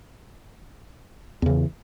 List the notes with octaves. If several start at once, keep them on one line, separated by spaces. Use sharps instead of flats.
E2 C#3 E3